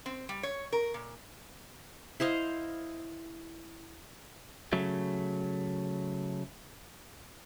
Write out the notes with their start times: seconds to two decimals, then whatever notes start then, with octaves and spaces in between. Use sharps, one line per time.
0.06 C4
0.29 G3
0.43 C#5
0.73 A#4
0.94 A#2
2.20 E4 C5 D#5 F5
4.73 C#3 F#3 A3